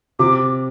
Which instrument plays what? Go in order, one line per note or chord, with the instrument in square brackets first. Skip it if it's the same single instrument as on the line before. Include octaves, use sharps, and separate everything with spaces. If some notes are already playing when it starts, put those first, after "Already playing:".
[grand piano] C3 [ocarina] D6